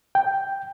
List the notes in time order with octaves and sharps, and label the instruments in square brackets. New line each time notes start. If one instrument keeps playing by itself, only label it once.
[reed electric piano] G5